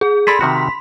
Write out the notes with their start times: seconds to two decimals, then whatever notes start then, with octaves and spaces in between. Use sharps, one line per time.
0.01 G#4
0.27 G#4 A4 D5 B5 C6 B6
0.41 C3 D#3 F#4